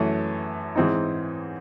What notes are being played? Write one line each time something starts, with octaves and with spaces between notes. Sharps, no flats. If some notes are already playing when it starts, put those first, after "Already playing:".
Already playing: F#2 E3 A3
G#2 E3 C4 D#4